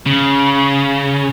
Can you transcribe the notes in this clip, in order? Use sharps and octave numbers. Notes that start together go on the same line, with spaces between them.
C#3